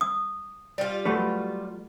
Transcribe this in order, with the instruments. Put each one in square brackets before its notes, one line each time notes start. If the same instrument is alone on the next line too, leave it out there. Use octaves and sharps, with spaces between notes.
[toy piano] D#6
[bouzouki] G3 F4
[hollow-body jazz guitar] F#3 A3 B4 [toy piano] G4